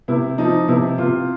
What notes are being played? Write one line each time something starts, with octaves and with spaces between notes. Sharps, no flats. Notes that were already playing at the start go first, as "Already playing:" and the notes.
C3 E4
F3 D#4
C3 E4
C3 F4